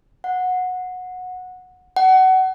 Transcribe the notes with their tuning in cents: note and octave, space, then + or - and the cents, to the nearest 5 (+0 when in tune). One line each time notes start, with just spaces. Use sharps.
F#5 -15
F#5 +25